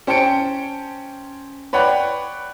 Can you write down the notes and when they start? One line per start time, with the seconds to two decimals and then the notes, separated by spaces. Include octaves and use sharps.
0.07 C#4 C5 G5 A5 C#7 D7
1.73 B4 C#5 D5 F#5 G5 B5